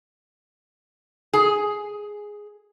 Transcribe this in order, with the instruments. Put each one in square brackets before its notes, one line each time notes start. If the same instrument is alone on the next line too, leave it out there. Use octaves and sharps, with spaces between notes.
[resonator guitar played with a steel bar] G#4